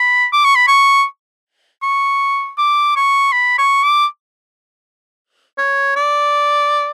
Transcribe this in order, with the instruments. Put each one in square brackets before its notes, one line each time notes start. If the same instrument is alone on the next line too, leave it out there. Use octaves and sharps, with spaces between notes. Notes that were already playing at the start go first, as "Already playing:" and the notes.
Already playing: [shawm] B5
D6
C#6
B5
C#6
C#6
D6
C#6
B5
C#6
D6
C#5
D5